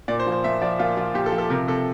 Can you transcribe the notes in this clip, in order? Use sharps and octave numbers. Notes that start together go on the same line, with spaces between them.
A#2 D5
C5
F3
C5
A#2 E5
F3 D5
A#2 F4
F3 F4
A#2 G4
A4
F3
A4
C3 A#4
C3 A4